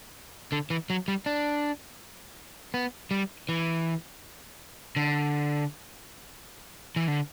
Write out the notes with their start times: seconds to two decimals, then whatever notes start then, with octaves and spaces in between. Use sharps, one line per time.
0.52 D3
0.70 E3
0.90 F#3
1.08 G3
1.26 D4
2.74 B3
3.11 G3
3.49 E3
4.96 D3
6.96 E3
7.08 D3